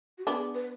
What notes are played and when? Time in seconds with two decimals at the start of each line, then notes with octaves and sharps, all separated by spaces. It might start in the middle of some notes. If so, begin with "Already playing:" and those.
0.18 F#4
0.26 B3 D4 G#4
0.54 B4